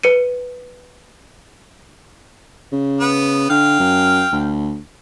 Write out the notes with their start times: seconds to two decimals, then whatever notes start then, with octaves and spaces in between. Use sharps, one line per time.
0.03 B4 C#7 D#7
2.72 C#3
3.00 B3
3.50 D3 F5 G5
3.80 F#2
4.32 D2